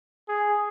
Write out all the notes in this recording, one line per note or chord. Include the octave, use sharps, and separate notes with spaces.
G#4